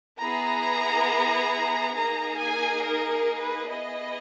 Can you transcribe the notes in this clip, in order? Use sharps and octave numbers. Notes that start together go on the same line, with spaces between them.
B3 E4 G#4 A#5
A#3 D#4 G#4 A#5
G#5
A#4
A#4
B4
B3 E4 G#4 D#5